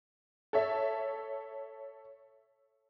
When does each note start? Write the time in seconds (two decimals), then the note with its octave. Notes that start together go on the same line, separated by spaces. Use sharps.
0.53 A4 C#5 E5